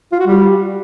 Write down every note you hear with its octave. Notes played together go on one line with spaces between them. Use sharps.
F4
F#4
G3